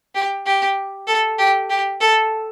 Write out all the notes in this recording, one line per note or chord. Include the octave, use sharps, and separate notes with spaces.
G4
G4
A4
G4
G4
A4